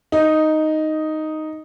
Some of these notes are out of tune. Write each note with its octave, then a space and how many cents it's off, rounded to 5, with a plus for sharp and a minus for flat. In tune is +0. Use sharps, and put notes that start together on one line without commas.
D#4 +0